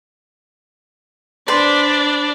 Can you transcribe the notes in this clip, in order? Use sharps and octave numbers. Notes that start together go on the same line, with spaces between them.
D4 B4 C5 D5 B5